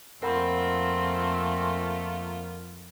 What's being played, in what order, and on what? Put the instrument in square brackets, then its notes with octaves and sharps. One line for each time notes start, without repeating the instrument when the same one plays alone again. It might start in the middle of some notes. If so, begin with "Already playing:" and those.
[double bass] F2 [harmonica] A3 A#3 F4 [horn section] C4 [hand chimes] A#4 F#5 B5